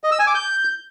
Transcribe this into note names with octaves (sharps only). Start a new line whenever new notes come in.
D#5
E6
G#5
D6
G6